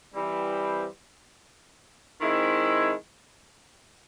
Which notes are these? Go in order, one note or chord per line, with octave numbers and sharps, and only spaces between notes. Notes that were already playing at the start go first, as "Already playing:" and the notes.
E3 G3 C4
D#3 G#3 C4 E4